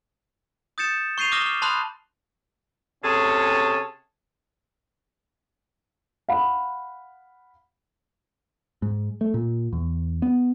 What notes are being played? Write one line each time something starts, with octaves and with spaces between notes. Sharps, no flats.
D#6 G6 A6 C#7 E7
C#6 G6 C7 D#7 F7
D6 D#6 F6 A#6 E7 G7
F6
A5 B5 C6 D#6 F6 F#6
C3 C#4 G#4 A4 C#5
F5 F#5 B5
G#2
A3
A#2
E2
B3